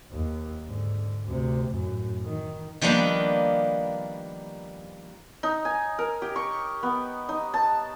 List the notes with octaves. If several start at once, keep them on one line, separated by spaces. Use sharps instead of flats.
D#2
G#2 D3
D2 C3
F#2 A2
D#3
D#3 F3 G3 A#3 B3 D4
D#4
G#5
A#4
G4
C#6
B3
D#4
A5